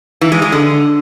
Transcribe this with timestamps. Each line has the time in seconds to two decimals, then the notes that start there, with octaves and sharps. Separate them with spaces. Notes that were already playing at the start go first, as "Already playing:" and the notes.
0.21 E3
0.32 G#3
0.42 G#3
0.52 D3